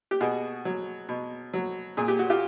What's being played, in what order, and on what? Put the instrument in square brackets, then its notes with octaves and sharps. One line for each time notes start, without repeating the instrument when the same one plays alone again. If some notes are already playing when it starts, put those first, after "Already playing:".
[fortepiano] G4
B2 F#4 G#4
F#3
B2
F#3
A#2 G#4
G4
F#4
F4 G4